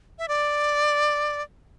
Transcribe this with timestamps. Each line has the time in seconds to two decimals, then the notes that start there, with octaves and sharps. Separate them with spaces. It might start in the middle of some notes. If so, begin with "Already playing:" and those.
0.19 E5
0.28 D5